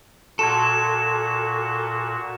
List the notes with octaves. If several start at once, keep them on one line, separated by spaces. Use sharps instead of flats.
A#2 F#4 A4 A5 C6 G#6 E7